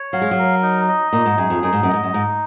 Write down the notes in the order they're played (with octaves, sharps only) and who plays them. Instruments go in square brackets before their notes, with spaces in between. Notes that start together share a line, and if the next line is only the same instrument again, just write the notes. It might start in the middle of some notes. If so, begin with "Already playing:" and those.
Already playing: [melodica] C#5
[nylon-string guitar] F#3 [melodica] F5
[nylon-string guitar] G#3
F#3
[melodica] A#4
D#4
D#5
[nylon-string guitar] A#2 [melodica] D#4
[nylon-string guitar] G#2
[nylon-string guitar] F#2 [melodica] G#4
[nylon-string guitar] F2
[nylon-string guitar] F#2 [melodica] D#4
[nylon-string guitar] G#2
F#2
[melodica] D#5
[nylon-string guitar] G#2
F#2
[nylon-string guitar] G#2 [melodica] D#4